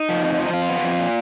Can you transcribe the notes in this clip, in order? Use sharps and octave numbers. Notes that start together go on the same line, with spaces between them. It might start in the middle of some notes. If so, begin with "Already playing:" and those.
Already playing: D#4
F3
F2
F3
D#4
F2 F4
B3
F2
A#2